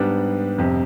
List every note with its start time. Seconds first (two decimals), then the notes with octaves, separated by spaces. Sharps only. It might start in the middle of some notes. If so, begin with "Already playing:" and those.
Already playing: G#2 G3 B3 D4
0.58 F1 F2 C3